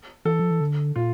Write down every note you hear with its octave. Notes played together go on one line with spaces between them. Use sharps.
E3 A4
F3
E3
D3
A#2 F4